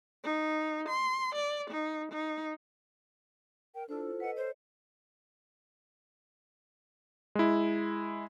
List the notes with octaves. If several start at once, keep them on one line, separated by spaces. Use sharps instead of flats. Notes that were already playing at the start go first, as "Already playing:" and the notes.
D#4
C6
D5
D#4
D#4
A#4 G5
D4 E4 F4 A4 C5
B4 D#5 F#5
C5 C#5
G#3 E4